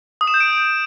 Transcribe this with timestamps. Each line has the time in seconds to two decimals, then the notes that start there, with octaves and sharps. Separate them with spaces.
0.21 D#6
0.27 E7
0.34 G6
0.40 D7